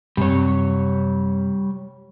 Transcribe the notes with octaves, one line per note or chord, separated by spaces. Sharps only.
F#2 C3 G3 C#5